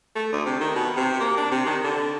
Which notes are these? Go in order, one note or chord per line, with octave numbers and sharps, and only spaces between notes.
A3
D2
C3
D#3
B2
C3
A#3
D4
C3
D#3
D3